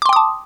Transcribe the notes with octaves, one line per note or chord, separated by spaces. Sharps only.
G5 A5 C6 D6 D#6